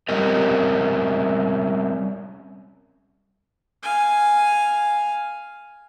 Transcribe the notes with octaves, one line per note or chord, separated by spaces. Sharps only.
G3 C4 C#4 A#4 D#5
F5 G#5